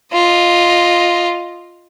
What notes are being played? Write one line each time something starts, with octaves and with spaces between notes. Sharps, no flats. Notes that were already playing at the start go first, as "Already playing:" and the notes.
F4 D#5